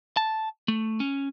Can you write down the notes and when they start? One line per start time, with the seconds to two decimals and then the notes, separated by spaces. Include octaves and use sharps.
0.17 A5
0.68 A3
1.00 C#4